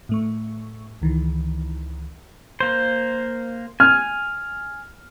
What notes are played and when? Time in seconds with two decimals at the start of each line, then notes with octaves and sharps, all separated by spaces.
0.09 A2 A3 C#6
1.02 C#2 D#3 E3
2.60 A#3 C5
3.80 G#5 F6